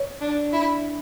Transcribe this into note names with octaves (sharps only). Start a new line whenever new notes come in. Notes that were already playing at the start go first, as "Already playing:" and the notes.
Already playing: C#5
D4
E4